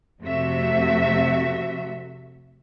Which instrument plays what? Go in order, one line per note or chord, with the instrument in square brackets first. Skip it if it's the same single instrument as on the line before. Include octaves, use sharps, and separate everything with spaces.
[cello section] F2 C3 A3 F#4 E5